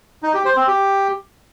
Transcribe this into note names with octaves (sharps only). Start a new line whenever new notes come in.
D#4
G4
C5
C4
G4